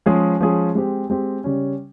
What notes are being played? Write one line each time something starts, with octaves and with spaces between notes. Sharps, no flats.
F3 G#3 C#4 G#4
F3 G#3 C#4 G#4
G#3 C4 G4
G#3 C4 G4
C#3 G3 C#4